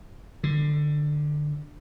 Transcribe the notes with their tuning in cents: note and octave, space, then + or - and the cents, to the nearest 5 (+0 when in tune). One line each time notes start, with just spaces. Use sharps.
D3 +15